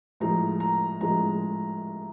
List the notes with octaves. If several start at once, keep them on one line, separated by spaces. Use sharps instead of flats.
A2 F3 G#3 A#5
A#5
A2 F3 G#3 A#5